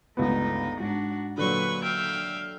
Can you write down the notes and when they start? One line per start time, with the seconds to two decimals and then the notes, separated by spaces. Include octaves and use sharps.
0.17 G1 C#2 A3 B3 D#4
0.80 G#2 D4 F#4
1.38 A#2 D3 F#3 B4 C#6
1.83 E5 F5 G5